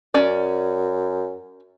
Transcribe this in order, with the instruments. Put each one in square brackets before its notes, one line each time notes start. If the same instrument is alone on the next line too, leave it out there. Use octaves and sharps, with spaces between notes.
[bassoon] F#2 [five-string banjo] C#4 D5